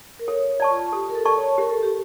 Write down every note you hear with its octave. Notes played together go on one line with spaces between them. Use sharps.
A#4
A4 C#5
C#5
D5 A5 C#6
F4
G4 A4
A#4
A4
D5 A5 C#6
C#5
G4 A#4
A4
G4